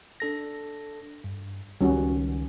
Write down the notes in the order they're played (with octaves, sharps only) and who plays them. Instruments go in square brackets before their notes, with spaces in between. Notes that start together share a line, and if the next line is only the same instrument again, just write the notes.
[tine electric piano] D4 A4 A#6
G2
[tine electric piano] C#2 D#3 [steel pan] G3 C#4 F#4